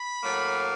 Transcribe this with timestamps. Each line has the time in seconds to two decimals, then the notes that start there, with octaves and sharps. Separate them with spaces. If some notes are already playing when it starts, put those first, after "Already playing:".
Already playing: B5
0.23 A2 F#3 A#3